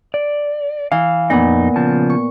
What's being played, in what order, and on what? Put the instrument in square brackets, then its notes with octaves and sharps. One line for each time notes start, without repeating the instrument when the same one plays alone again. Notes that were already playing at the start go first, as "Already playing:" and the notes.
[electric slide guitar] D5
[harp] E3 [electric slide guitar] F5
[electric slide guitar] F2 D#4 [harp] A#2 B3 F#5
[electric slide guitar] C#3 F3 A5
[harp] C#6